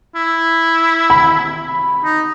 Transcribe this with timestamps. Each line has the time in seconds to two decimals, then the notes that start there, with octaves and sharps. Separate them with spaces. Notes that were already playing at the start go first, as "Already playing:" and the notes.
0.15 E4
1.10 B5
2.04 D#4